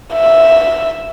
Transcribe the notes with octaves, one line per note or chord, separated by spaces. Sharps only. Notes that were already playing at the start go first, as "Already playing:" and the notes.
E5